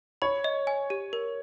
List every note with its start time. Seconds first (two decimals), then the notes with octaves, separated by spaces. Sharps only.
0.22 C#5 B5
0.44 D#5
0.67 G#5
0.90 G4
1.13 A#4